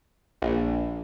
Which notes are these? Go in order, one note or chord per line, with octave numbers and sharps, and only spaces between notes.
A#1